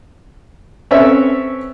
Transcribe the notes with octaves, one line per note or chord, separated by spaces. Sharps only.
C4 C#4 A4 B4 C#5 E5